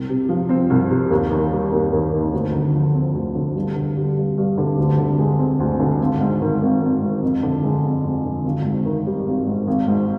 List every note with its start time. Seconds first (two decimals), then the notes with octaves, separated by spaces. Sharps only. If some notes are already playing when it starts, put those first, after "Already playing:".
Already playing: C2
0.09 C3
0.29 F3
0.49 C4
0.70 C2
0.90 C3
1.10 D#2
1.31 D#3
1.52 G3
1.72 D#2
1.93 D#2
2.13 D#3
2.33 D2
2.53 D3
2.74 F3
2.94 C4
3.14 D2
3.35 D3
3.56 G2
3.76 D3
3.96 G3
4.17 G2
4.38 G2
4.58 D3
4.78 D2
4.98 D3
5.19 G#3
5.39 C4
5.60 D2
5.80 D3
6.00 G#1
6.21 G#2
6.41 D#3
6.61 G#1
6.82 G#1
7.02 G#2
7.22 F2
7.43 D3
7.63 G#3
7.84 F2
8.04 F2
8.24 D3
8.45 G#1
8.65 G#2
8.85 D#3
9.06 G3
9.26 G#1
9.47 G#2
9.68 G#1
9.88 G#2